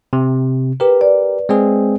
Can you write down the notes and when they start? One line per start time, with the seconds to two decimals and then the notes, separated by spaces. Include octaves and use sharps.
0.13 C3
0.80 G4 A#4 B4
1.01 D5
1.49 G#3 C4 G#4